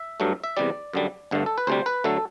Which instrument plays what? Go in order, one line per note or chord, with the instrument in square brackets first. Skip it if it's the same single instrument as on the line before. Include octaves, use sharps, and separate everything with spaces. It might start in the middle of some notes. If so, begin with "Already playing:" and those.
Already playing: [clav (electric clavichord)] E5
G2 F#3 A3
E5
E2 C3 G3 D5
F#2 D3 G3
G1 G2 D3 A3
A4
B4
D2 C3 G3 C5
B4
D3 F#3 A3 A4